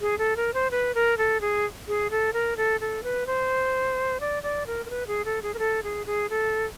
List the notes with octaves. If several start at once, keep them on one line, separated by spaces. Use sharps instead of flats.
G#4
A4
A#4
C5
B4
A#4
A4
G#4
G#4
A4
A#4
A4
A4
B4
C5
D5
D5
A#4
A#4
B4
G#4
A4
G#4
A#4
A4
G#4
G#4
A4